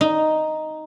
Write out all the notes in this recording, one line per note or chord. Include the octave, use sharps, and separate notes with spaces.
D#4